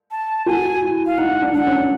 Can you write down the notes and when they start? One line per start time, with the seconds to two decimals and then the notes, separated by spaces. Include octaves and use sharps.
0.11 A5
0.46 F#4 G#5
0.82 E4
1.06 F5
1.18 D#4 F#5
1.42 D4
1.54 D4 F#5
1.67 C#4